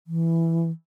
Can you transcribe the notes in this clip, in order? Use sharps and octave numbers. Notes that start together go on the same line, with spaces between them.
E3